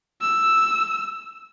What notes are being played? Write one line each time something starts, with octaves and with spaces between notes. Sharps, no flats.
E6